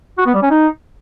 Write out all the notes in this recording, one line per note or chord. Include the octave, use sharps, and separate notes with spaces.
F#4
B3
G3
C#4
D#4